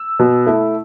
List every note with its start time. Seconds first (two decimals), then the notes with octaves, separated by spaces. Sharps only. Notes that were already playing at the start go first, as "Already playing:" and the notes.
Already playing: E6
0.19 B2
0.46 A3 E4